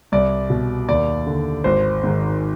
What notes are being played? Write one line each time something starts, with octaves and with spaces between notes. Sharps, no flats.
C2 D5
B2
D#2 D5
D3
G#1 C5
G#2 D#3